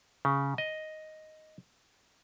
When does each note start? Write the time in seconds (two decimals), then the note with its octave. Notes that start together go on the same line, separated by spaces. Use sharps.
0.25 C#3
0.58 D#5